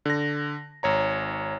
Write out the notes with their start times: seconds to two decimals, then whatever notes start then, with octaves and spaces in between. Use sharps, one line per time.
0.05 D3 A#6
0.83 G#1 C#5 A#5